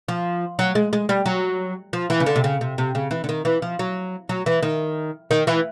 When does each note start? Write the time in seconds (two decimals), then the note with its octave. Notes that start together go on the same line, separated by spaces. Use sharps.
0.08 F3
0.59 F#3
0.75 G#3
0.93 G#3
1.09 G3
1.26 F#3
1.93 F3
2.10 E3
2.20 C#3
2.26 D3
2.36 C3
2.44 C#3
2.61 C3
2.78 C3
2.95 C#3
3.11 E3
3.24 D3
3.29 D#3
3.45 E3
3.62 F3
3.79 F#3
4.29 F#3
4.46 E3
4.62 D#3
5.31 D#3
5.47 E3